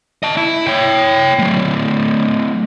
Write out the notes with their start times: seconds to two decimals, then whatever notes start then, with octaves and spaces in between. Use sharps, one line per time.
0.23 D#5 A5
0.37 E4
0.67 C#5 G5
1.39 F#3 A3